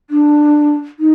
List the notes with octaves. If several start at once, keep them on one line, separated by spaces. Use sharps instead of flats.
D4
D#4